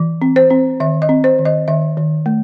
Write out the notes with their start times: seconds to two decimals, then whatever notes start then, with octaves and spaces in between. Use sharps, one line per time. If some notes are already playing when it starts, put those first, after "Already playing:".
Already playing: E3
0.22 C4
0.36 C5
0.50 C4
0.80 D#3 E5
1.02 D#5
1.09 C4
1.24 C5
1.39 D#3
1.45 D#5
1.68 D#3 E5
1.97 D#3
2.26 A3